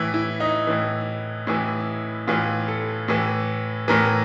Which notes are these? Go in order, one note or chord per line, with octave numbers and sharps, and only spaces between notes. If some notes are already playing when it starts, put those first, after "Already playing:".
Already playing: A2 E3 E4
E4
D#4
A2 E3
A2 E3 E4
A2 E3 F4
A4
A2 E3
A2 E3 A#4